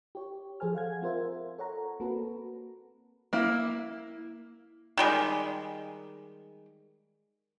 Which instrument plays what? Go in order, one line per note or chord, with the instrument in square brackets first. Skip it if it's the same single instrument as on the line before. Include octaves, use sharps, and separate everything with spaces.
[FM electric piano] G4 C#5
F3 G#4 A4 C5 G#5 F6
F5 F#5 G#6
C4 F4 A#4 C5 E5
A4 C#5 F#5 A#5
A#3 C4 F#4 A4 B4
[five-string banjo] A#3 E4
[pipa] D#3 G3 G#3